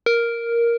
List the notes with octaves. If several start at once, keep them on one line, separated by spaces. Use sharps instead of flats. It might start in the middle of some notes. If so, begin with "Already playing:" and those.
A#4